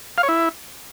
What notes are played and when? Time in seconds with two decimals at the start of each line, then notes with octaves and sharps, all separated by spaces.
0.18 F5
0.23 C#5
0.29 E4